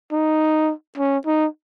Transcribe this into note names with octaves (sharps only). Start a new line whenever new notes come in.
D#4
C#4
D#4